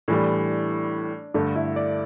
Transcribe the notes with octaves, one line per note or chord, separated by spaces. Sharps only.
A2 E3 G3 D4
G2 D3 A3 D4
E4
D5